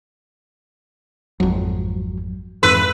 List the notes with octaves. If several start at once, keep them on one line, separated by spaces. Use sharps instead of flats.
G#1 F2 F#3
F2 G#2 E3 B4 E6 F#6